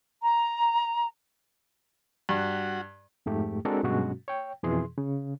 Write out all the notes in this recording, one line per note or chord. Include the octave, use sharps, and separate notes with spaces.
A#5
G2 F#4
F2 G#2 A3 G4
G#3 C4 D4 F#4 A4 A#4
G2 B2 F#3 G#3 C#4 F#4
C#5 G5
F2 B2 E3 G#4 C6
C#3